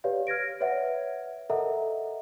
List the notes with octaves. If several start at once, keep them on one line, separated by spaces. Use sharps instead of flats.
G4 B4 C#5 D5 F5
F6 G#6 A#6 D7
B4 C#5 D5 E5 F#5
A4 A#4 D#5 E5 F#5 A#5